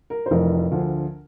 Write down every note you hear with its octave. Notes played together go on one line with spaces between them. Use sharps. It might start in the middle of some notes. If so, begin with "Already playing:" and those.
A#4
C5
F1 F2 E3 A#4
D2 D3 F3